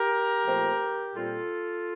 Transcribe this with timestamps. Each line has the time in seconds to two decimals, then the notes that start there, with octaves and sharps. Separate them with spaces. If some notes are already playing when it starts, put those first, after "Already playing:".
Already playing: G4 A#4
0.44 A#2 F3 A3 C4
1.14 A#2 G3 C4 F4 A4